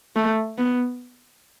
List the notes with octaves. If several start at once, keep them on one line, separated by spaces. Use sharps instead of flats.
A3
B3